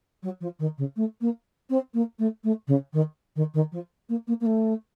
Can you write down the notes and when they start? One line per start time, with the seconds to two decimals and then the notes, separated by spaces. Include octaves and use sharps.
0.22 F#3
0.40 F3
0.59 D#3
0.77 C#3
0.96 A3
1.20 A#3
1.69 C4
1.93 A#3
2.18 A3
2.43 A3
2.67 C#3
2.93 D#3
3.35 D#3
3.54 D#3
3.72 F3
4.09 A#3
4.27 A#3
4.40 A#3
4.45 A3